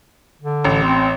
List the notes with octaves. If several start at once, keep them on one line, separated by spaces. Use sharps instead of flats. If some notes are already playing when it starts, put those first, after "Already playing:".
D3
A1
C4